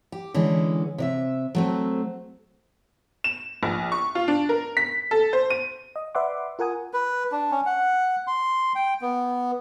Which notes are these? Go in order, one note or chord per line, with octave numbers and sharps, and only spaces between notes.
G4
D3 E3 G#3 C#4
C3 D5 E5
F#3 A3 C4
E7
A#1
C#6
F4
D4
A#4
B6
A4
C5
D#7
D#5
B4 D5 E5 F#5 C6 D6
F4 A#4 F#5 G#5 D#6
B4
D4
C#4
F#5
C6
G5
B3